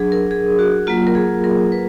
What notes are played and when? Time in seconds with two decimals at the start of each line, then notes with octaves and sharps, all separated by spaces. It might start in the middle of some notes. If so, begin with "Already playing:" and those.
Already playing: F#3 D4 G#4
0.12 A#4
0.31 G#4
0.59 F#4
0.87 F#3 A#3 F4
1.07 A#4
1.15 G#4
1.44 A#4
1.72 B4